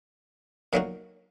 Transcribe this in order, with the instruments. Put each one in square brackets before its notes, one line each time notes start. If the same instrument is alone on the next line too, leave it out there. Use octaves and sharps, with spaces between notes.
[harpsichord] A#2 F#3 A#3 D#4 F#4